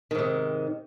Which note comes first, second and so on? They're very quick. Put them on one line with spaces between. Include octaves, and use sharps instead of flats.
D#3 G#2 C3